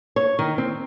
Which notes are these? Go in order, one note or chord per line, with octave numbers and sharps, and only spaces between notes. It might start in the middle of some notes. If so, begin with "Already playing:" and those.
C#5
D#3
C4